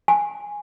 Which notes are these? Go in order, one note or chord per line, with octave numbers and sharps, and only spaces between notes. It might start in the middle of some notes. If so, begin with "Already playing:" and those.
G#5